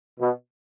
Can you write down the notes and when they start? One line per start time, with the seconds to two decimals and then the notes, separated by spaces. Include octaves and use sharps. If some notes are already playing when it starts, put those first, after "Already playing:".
0.18 B2